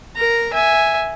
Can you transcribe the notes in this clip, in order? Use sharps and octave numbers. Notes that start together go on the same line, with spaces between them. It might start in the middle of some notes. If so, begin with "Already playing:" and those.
A#4 A#5
E5 G#5